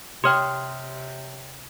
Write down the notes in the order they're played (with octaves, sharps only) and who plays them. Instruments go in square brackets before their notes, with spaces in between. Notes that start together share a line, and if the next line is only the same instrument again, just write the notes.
[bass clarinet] C3 [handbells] G4 C#5 G5 [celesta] C6 D#6 F6